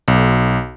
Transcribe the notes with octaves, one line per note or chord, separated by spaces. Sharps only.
B1